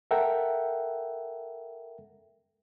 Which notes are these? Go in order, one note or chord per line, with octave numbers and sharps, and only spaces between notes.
A4 A#4 E5 F#5 G5